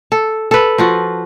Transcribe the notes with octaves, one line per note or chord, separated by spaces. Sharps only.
A4
A4 B4
F3 F4 F#4